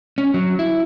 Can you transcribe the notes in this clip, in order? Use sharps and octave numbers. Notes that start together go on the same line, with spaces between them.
C#4
F#3
E4